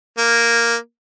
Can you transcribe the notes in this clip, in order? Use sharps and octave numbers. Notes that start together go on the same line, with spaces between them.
A#3